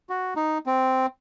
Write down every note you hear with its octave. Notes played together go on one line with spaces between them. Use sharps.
F#4
D#4
C4